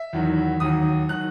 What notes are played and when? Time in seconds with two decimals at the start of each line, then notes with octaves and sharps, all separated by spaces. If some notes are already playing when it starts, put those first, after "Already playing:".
Already playing: E5
0.13 E2 D#3 F#3
0.60 D#2 D#3 F#3 D#6
1.09 D#3 F#3 F#6